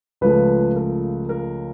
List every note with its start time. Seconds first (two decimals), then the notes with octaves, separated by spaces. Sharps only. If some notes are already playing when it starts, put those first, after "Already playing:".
0.21 C#2 C#3 F3 A3 B4
0.76 A#4
1.29 A#4